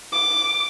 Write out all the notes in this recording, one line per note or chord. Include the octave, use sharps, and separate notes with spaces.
D6